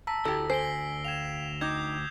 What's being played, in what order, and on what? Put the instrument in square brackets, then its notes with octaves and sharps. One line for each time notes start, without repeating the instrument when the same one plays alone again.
[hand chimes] A5 A#5 [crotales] E6 B6
[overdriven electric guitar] D2 [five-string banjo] E4 G4 [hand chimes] A4 [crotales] A#6
[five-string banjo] C5 [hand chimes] G#5 [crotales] C7 D7 G7
[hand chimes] F5 G5 G#6 [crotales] E7 F7
[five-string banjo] D#4 [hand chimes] G5 D6 [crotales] D#6 G6 G#6